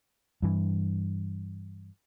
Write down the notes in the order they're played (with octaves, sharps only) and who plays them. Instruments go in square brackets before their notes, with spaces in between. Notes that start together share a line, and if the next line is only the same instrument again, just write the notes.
[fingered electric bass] G2 E3